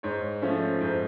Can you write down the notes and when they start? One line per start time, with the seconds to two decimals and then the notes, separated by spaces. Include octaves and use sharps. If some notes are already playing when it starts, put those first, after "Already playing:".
0.03 G#2 C#5
0.42 F3 A3 C#4
0.81 G#2